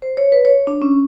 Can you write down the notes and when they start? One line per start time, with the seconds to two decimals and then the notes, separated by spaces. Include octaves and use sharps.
0.02 C5
0.17 C#5
0.32 B4
0.45 C#5
0.67 D4
0.82 C#4